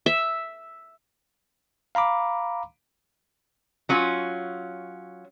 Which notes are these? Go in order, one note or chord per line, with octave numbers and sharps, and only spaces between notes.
E5
F5 A#5 B5 D6
F#3 C#4 F4